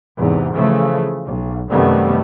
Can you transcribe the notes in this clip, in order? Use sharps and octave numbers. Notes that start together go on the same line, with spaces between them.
E2 G#2 C3
C#3 E3 F3 A3
B1
F#2 C3 D#3 G3 A3 B3